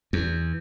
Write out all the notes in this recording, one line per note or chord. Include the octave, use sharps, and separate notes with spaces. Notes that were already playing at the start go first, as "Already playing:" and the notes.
E2